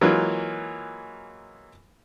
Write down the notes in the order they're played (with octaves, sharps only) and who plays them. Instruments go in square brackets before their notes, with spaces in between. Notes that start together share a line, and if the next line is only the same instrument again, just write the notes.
[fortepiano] E3 F#3 G#3 A#3 F4